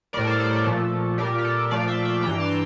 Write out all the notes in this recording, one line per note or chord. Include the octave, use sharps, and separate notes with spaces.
A2 G3 A#4 D5
A4 C5
A4 C5
A4
A#2 F3 A3 A4
A#2 G3 G4 A#4
G4
A4
A#2 F3 A3 D5 F5
E5 G5
E5 G5
G2 E3 G3 G5 A#5
A5 C6